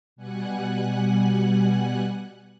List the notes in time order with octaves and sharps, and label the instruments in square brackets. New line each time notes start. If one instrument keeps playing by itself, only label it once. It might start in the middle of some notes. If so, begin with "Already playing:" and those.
[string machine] B2 G3 F#5 G#5 F#6